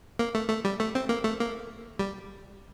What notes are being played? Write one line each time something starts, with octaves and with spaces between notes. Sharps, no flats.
A#3
A3
A3
G3
A3
C4
A#3
A3
A#3
G3